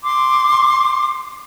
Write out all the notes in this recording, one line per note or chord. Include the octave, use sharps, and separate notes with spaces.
C6 D6